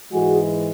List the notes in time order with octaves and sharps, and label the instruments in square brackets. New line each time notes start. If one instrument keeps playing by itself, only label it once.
[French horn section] G#2 E3 G#3 F#4 G#4